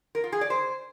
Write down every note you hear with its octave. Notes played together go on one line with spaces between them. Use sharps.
A#4
F4
G#4
D5
C5